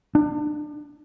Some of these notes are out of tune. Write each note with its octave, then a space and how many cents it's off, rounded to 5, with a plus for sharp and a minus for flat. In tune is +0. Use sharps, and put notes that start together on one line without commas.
D4 +30